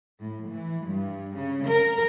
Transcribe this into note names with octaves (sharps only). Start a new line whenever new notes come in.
A2
E3
G2
C#3
A#4